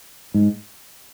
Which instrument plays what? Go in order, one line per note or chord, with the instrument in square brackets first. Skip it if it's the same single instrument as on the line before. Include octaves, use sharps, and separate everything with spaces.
[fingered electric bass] G#2